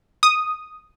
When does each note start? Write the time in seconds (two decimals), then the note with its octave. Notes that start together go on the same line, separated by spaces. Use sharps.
0.23 D#6